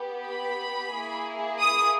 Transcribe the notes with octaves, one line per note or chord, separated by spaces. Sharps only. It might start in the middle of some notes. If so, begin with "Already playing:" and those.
Already playing: B3 G4
B5
A#3 E4 G#4
D#6